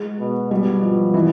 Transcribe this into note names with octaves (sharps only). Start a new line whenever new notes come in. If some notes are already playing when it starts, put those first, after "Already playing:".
Already playing: G#3
B2
B2 G3
G3
F3
E3